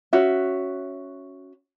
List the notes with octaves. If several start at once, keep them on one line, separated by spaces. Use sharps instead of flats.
C#4 F#4 E5